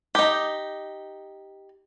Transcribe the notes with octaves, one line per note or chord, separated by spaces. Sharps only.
D#4 G4